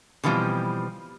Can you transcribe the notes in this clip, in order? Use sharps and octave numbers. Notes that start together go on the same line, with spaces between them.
B2 D3 E3 F3 G3 C4